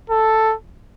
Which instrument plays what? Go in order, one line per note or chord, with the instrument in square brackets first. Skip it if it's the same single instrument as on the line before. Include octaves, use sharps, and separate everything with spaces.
[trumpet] A4